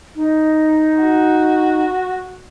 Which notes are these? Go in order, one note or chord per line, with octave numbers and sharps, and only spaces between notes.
D#4
F#4